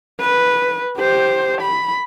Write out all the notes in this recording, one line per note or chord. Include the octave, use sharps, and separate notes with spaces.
B4
G4 C5
B5